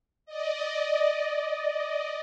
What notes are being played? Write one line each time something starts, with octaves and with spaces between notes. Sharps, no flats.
D5 D#5